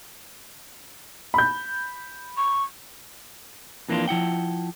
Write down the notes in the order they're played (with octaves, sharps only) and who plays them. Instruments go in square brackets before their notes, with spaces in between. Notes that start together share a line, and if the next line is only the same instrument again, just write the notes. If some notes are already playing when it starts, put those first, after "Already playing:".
[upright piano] B5 G6
[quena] C#6
[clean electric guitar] F2 E3 A#3 B3 D4 F4
F3 E4 F#5 G5